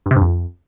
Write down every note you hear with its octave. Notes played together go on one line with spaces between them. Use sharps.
G2
C3
G2
F2